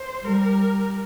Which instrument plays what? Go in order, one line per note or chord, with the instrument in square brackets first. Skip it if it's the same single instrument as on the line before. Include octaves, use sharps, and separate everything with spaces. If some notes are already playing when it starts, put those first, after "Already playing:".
Already playing: [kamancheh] C5
[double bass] G3 [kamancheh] A#4